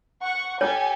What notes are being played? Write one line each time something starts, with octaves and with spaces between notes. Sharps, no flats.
F#5 C#6
G4 A4 C#5 G#5